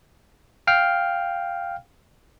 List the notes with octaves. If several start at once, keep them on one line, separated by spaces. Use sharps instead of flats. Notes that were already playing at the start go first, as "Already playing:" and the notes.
F5 G5 F6